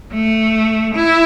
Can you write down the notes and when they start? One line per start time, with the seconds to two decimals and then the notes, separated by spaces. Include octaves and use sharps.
0.14 A3
0.95 E4